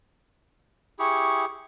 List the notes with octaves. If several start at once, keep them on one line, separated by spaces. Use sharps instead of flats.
E4 G4 G#4 C#6